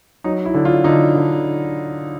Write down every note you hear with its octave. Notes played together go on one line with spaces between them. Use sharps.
F#3 D#4
E4
D3
F4
D3 D#4
D3